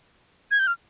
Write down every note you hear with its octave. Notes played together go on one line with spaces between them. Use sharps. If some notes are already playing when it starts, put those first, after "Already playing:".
G#6
G6
F6